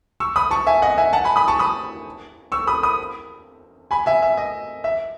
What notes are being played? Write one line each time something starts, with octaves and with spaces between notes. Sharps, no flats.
C#6 E6
B5 D#6
A5 C#6
E5 G#5
D#5 F#5
E5 G#5
F#5 A5
G#5 B5
B5 D#6
A5 C#6
B5 D#6
C#6 E6
B5 D#6
B5 D#6
G#5 B5
E5 G#5
E5
D#5
E5